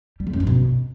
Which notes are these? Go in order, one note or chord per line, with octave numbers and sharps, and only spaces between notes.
G3
D3
F#2
G2
B2